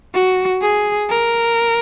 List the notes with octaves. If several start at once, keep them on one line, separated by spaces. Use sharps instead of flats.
F#4
G#4
A#4